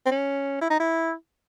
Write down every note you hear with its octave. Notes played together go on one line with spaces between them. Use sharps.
C4
C#4
E4
D#4
E4